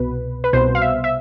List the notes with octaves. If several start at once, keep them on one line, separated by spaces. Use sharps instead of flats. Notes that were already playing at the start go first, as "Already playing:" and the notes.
Already playing: C2 B2 B4
B4
C2 B2 C5
F5
E5
E5